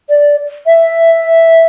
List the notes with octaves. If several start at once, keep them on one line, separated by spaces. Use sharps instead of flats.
D5
E5